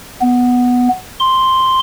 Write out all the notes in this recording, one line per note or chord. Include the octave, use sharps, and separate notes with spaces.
B3
C6